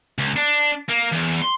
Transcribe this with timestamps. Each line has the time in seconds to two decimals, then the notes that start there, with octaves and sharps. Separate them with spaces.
0.18 C#2
0.37 D4
0.89 A#3
1.12 E2
1.42 C6